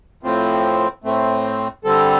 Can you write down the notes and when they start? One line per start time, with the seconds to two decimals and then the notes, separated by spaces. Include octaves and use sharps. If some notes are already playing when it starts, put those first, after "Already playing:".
0.23 A2 F3 C4
1.04 A2 A3 C4
1.84 D3 G3 C4 A4